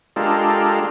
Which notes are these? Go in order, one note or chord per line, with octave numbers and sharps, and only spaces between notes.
G#3 D4 F4 G4 A4 A#4